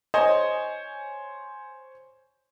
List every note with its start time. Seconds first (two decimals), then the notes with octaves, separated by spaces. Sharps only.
0.14 C5 C#5 D#5 G#5